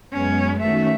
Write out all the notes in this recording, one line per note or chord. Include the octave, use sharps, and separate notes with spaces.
F#2 G#3 B3 C#4
D#3 A3 C#4 F#4 E5